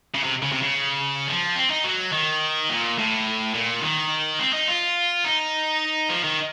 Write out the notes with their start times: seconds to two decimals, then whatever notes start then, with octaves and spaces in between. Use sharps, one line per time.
0.15 C#3
0.24 C3
0.42 C#3
0.52 C3
0.62 C#3
1.28 F3
1.56 C4
1.70 D#4
1.84 F#3
2.13 D#3
2.69 A#2
2.98 A2
3.55 A#2
3.82 D#3
4.39 C4
4.53 D#4
4.68 F4
5.25 D#4
6.09 F3
6.24 D#3